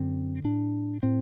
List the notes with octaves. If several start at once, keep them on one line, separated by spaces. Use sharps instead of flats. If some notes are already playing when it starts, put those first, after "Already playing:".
Already playing: F#2 D3 C4
A2 D4
A2 C4